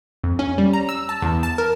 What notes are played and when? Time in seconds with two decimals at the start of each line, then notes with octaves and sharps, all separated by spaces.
0.24 F2
0.39 C#4
0.58 G3
0.73 A#5
0.89 E6
1.09 A5
1.22 E2
1.43 A5
1.58 A#4